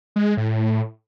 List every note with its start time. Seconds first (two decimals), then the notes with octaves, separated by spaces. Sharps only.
0.16 G#3
0.27 G#3
0.37 A2